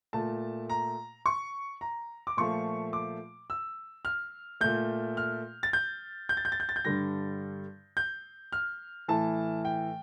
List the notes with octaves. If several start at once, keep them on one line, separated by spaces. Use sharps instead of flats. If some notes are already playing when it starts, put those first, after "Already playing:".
A#2 A3 A5
A#5
C#6
A#5
D6
A#2 F3 A3 C#6
D6
E6
F6
A#2 A3 G6
F6
A6
G6
G6
A6
G6
A6
G6
A6
G6
G2 D3 G3 A#6
G6
F6
A2 E3 A3 A5
G5